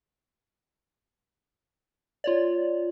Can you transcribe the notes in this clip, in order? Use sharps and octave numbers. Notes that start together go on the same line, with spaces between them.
F4 C#5 D5